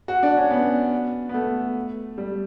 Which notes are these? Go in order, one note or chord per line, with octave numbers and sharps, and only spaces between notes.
F#4
D4
C#4
B3
B3
A3
G3